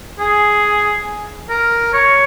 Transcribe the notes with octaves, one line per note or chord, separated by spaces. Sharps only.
G#4
A#4
C#5